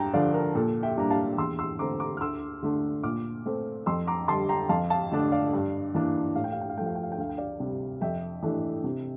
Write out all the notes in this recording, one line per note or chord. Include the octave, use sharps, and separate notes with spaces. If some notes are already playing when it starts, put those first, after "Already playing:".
Already playing: G2 G5 A5 A#5
D3 F3 D5 F5
A#4
A#2 A4
E5 G5
G3 A#3 D4 A#5
F5 A5
E2 C6 E6
C6 E6
D3 A3 C4 A#5 D6
A#5 D6
F6
D2 C6 E6
D3 A3 D4
A#2 D6 F6
A3 C4
F2 C6 E6
A#5 D6
D3 G3 A5 C6
G5 A#5
F2 F5 A5
F5 A5
D3 A3 D4
D5 F5
G2
E3 A#3 D4
A2 F5
G5
F5
G5
F5
F3 A3 G5
F5
G5
F5
G5
D2 F5
G5
D5 F5
C3 G3
F2 E5 G5
E3 A3 D4
C3